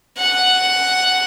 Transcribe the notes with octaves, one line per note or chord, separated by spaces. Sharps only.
F#5